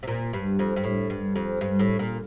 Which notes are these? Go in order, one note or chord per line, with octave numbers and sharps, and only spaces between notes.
C3
A#2
G2
F2
G2
A2
G2
F2
G2
A2
A#2